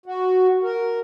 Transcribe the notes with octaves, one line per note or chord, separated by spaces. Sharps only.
F#4
A#4